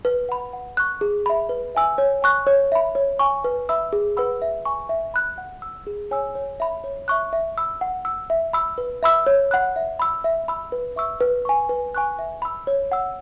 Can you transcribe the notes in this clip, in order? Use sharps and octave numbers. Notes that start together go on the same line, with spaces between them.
B4
F#5 B5
F#5
C#6 F#6
G#4
E5 B5
B4
E5 G#5 E6
C#5
G#5 C#6 F#6
C#5
E5 B5
C#5
G#5 C#6
B4
E5 B5 E6
G#4
B4 F#5 B5 E6
E5
G#5 C#6
E5
B5 F#6
F#5
E6
G#4
C#5 G#5 E6
C#5
E5 B5
C#5
E5 C#6 F#6
E5
B5 E6
F#5
E6
E5
B5 E6
B4
E5 B5 E6
C#5
F#5 B5 F#6
E5
B5 E6
E5
B5 E6
B4
E5 C#6 E6
B4
G#5 C#6
B4
G#5 C#6 F#6
E5
B5 E6
C#5
F#5 E6